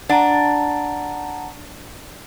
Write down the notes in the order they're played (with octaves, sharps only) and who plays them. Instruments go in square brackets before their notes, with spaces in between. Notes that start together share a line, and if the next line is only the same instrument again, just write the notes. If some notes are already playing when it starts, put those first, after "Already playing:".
[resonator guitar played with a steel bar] D4 [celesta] F#5 A5 A#5